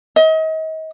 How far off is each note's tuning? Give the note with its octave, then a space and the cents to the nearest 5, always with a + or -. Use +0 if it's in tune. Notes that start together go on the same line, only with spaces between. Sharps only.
D#5 +35